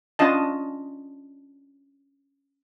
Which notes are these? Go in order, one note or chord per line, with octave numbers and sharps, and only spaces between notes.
C#4 D4 F4 D#5 A5